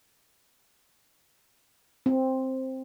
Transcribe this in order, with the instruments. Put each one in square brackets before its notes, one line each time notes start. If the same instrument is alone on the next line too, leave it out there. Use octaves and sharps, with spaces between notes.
[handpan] C4